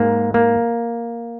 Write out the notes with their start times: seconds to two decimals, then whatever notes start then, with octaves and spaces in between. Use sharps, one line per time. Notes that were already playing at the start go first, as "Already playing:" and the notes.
Already playing: G#2 A#3
0.34 A#3